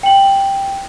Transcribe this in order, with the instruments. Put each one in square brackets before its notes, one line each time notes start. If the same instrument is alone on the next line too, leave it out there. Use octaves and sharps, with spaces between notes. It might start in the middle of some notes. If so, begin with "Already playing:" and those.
[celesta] G5 F#7